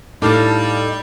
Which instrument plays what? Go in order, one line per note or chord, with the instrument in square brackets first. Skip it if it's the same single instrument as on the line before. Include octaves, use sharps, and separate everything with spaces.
[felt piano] A2 [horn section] G3 [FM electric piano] D4 F5 A5 [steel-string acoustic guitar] D#4 A4 D#5